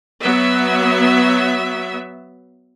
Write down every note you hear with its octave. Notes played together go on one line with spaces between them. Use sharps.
F#3 B3 E5